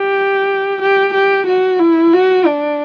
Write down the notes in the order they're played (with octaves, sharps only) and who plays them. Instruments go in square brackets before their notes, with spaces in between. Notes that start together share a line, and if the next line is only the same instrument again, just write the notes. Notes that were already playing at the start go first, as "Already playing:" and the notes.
Already playing: [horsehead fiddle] G4
G4
G4
F#4
E4
F#4
D4